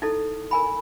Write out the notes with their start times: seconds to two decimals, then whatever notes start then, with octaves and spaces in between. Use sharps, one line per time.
0.02 D#4 E4 A4
0.51 A#4 G#5 B5